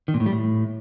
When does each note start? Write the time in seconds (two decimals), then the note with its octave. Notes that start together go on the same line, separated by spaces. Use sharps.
0.08 D#3
0.14 A#2
0.20 A2
0.26 G3
0.32 A2